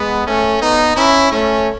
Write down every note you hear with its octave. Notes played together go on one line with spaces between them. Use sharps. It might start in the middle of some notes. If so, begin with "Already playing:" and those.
Already playing: G#3 B3
A3 C#4
B3 D#4
C#4 E4
A3 C#4